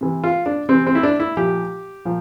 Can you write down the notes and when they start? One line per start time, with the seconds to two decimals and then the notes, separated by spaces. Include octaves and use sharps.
0.01 C3 E3
0.24 F4
0.46 D4
0.69 C3 E3 C4
0.87 C4
0.95 E4
1.03 D4
1.20 E4
1.37 A#2 F3 G4
2.05 A#2 F3